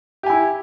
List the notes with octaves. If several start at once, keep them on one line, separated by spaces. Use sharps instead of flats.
E4 G4 G#5